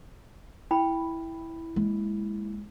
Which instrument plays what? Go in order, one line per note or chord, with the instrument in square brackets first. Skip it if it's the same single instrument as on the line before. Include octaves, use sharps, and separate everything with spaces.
[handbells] E4 [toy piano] G5 B5
[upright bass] G#3 A#3